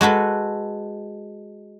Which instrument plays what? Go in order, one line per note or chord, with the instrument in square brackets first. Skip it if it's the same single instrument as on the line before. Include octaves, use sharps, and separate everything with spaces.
[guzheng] G#3 F#4 A4 B4